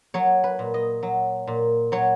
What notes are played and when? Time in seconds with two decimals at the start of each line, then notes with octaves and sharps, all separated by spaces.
0.14 F#3 C#5
0.44 B4
0.59 A#2
0.74 D#5
1.03 F#3
1.47 A#2
1.92 F#3 C#5